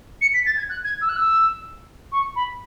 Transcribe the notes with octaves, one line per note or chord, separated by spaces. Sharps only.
C#7
B6
A6
G#6
F#6
G#6
E6
F#6
E6
C#6
B5